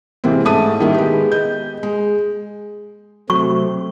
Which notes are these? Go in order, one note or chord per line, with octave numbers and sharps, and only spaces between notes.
C3 E3 G#3 A#3 C4
G#2 A3 C#4 A5 D#6 D#7
D#3 G3 A#3 E4
G#3 B3 G4
D#5 G6
G#3
C3 F#3 A3 C4 C#6